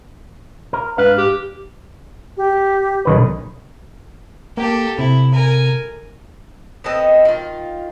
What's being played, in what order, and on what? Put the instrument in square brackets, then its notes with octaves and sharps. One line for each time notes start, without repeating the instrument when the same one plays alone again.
[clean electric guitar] A#4
[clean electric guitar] G#2 D4 F5 [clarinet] B4
[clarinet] G4
[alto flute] G4
[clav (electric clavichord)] B1 D#3 B4
[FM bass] A#3 [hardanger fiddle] G4 A4
[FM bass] C3 [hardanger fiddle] E4
[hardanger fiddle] A#4 G#5
[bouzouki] B3 C4 A4 D#5
D#3 F4